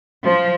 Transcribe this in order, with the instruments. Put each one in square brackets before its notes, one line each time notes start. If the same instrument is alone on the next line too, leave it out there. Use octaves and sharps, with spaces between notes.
[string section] F3